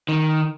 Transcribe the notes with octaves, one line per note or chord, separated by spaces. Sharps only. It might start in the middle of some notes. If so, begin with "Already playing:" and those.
D#3